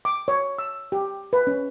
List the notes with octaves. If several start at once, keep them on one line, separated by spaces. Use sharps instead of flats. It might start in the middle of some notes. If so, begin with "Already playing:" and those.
D6
C#5
E6
G4
B4
C#4